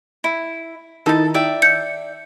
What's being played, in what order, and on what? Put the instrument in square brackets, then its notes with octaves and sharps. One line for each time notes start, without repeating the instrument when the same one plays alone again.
[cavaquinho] E4
[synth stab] D#3 D#4 E4 [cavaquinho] A4 A5
[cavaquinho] D5 E5 G5
[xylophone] G6 C#7